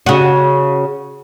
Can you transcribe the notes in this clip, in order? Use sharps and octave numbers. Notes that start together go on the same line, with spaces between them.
C#3 F#4